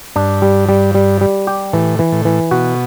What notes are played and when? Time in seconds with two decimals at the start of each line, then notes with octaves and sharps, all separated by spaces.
0.16 G2 D4
0.42 G3
0.69 G3
0.95 G3
1.21 G3
1.47 G4
1.73 A2 E3
1.99 E3
2.12 A2
2.25 E3
2.51 B2 F#4